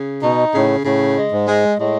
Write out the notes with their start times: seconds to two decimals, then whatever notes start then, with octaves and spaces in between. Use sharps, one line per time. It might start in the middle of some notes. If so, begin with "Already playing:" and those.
Already playing: C#3
0.23 B2 D#4
0.54 A2 C#3
0.85 A2 C#3
1.16 G#3
1.32 G#2
1.47 G#3
1.78 A2 G#3